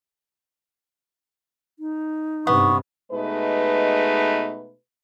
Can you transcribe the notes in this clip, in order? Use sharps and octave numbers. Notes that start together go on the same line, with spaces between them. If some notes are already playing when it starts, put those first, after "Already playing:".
D#4
G2 C3 B3 C#6
B2 G#3 A3 D#4 B4